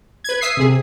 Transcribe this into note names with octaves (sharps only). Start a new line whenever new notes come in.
B4 G#6
E5 D#6 B6 C7
C3 G#4